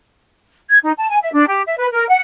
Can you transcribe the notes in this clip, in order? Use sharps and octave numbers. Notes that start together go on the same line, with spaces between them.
G#6
D#4
A5
G#5
E5
D4
G4
E5
B4
A#4
F#5